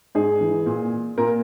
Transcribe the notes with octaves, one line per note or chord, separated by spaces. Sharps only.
G#2 G#4
E3
A#2
A#2 A#4